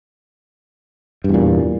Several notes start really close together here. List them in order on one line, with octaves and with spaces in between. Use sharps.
G2 E2 A#2